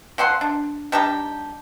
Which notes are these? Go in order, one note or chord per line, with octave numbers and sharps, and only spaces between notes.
F3 C4 F#5 C6
D4
G3 D4 D#4 G4